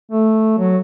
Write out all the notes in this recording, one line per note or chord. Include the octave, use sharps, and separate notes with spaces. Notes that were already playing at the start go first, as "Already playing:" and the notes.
A3
F#3